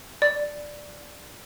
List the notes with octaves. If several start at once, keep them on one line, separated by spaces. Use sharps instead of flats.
D5